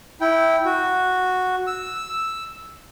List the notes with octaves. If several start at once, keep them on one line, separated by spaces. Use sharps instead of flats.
E4 G5
F#4
E6